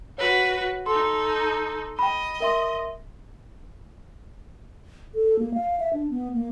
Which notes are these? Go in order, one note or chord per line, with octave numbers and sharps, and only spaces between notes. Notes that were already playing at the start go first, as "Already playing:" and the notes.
F#4 B4 C#5
D#4 A4 C6
D#5 G5 B5
A#4 E5 C6
A4
A#3
F5
E5
D4
B3
A#3